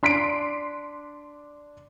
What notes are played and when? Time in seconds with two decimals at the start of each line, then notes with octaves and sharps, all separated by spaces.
0.03 D4 C6 B6 C7 D7